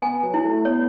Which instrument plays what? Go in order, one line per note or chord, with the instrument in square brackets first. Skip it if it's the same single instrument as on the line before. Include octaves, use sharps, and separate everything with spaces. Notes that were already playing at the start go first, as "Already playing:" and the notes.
[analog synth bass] B3 [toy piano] G#5
[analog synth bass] F#3
[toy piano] E4
[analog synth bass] A3
[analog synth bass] B3 [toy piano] C#5